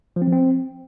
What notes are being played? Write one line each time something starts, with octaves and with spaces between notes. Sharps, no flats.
F3
C4
F3
C4